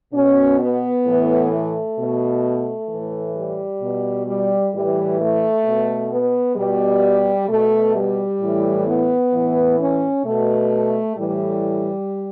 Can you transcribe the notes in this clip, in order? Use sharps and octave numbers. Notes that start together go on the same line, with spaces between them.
B2 C#4
B3
A2 E3
A3
B2
A2 E3
G3
B2
G3
A2 E3 G3
A3
B2
B3
B2 G3
B2 A3
G3
A2 E3
B3
A2 E3
C#4
B2 A3
A2 E3 G3